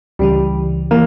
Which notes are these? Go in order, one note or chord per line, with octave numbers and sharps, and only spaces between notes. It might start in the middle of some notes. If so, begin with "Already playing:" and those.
C#2 C#3 E3 G3
E3 A#3